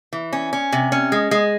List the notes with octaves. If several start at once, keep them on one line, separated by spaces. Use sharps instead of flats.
E3
C#4
C#4
C3
C#4
G#3
G#3